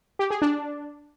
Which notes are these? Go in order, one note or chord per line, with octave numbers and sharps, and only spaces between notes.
G4
G#4
D4